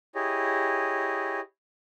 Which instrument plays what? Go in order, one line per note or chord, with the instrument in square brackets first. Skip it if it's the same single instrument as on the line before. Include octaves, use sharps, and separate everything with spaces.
[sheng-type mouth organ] E4 G4 G#4 C#5 D#5